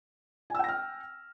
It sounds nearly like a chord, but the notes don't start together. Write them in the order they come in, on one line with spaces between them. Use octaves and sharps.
G#5 E6 G5 A#6 F6